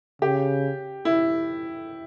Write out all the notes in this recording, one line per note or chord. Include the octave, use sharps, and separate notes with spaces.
C#3 G4
E4